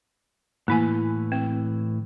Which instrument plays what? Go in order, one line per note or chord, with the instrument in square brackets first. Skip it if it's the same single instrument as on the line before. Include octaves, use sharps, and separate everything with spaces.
[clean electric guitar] A2 E3 [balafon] A#3 E4 G#5
[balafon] C4